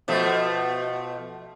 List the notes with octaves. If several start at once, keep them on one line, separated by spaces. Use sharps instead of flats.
B2 F3 A3